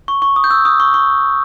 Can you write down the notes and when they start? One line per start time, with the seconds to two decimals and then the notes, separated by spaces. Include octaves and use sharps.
0.08 C#6
0.22 C#6
0.36 D#6
0.44 G6
0.51 E6
0.65 D#6
0.80 C#6
0.94 C#6